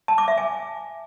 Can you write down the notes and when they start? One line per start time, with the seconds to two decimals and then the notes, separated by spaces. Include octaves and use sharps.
0.08 A5
0.18 D6
0.28 E5
0.38 G#5